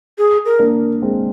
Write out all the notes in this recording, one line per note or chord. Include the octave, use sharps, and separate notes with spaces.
G#4
A#4
A#3 D4
G#3 C4